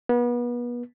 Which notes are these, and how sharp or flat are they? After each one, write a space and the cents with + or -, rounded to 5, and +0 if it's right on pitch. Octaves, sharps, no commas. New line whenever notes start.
B3 -30